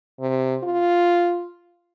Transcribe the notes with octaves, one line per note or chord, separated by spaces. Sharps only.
C3
F4